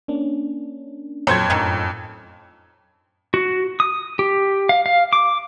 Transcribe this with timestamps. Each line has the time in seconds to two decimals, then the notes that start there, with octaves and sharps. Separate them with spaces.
0.08 A#3 C#4 D4
1.27 F2 A#2 F#3 A4 C5 C#5 G#6
1.50 F#2 A2 D3 D#3 C#4 E6
3.34 F#4
3.80 D#6
4.19 G4
4.69 F5
4.86 F5
5.13 D6